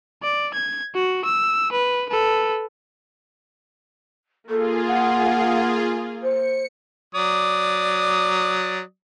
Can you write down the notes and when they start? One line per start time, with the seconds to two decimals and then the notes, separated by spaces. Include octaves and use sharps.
0.23 D5
0.54 G#6
0.95 F#4
1.24 E6
1.72 B4
2.09 A4 B4
4.49 A#3 F4 G#4 A4
4.87 F#5
6.22 C5 C#7
7.15 F#3 D5 D#6